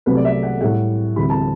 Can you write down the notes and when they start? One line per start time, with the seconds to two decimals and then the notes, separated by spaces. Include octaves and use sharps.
0.06 C2 C3 F#3 A3 B4
0.17 D5
0.25 E5
0.43 F#5
0.61 A2 G3 F#5
1.16 D2 C3 E3 G3 B5
1.30 A5